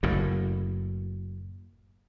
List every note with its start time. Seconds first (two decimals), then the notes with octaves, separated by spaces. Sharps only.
0.03 F#1 F#2 A2